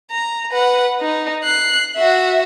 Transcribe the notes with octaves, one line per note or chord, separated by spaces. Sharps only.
A#5
B4 F#5
D#4
F#6 C7
F#4 E5